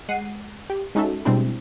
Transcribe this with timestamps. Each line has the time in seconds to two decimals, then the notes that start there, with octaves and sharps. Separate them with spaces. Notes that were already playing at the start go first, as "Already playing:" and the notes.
0.09 G#3 F#5 C7 D#7
0.70 G4
0.95 G#3 C#4 D#4 F#4 A4 E5
1.25 B2 G3 G#3 C4 D4 E4